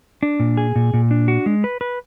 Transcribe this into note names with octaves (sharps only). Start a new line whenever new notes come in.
D4
A#2
G#4
A#2
A#2
D4
F#4
G#3
B4
B4